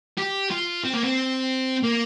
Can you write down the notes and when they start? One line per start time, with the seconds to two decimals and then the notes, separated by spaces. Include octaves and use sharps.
0.18 G4
0.51 F4
0.84 C4
0.93 A#3
1.03 C4
1.83 A#3